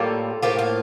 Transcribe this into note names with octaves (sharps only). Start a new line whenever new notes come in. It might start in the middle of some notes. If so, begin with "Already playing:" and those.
Already playing: A2 G3 A#3 F4 A4
A2 F3 A#3 F4 G4
F4